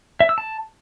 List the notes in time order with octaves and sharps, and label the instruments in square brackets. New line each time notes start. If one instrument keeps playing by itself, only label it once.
[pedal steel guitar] E5
E6
A5